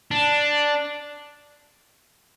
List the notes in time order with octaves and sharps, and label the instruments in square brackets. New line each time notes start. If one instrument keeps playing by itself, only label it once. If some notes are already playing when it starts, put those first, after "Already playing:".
[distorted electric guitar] D4